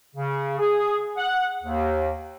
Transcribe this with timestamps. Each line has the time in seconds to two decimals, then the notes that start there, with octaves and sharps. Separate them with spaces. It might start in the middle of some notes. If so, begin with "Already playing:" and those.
0.16 C#3
0.59 G#4
1.17 F#5
1.63 D#2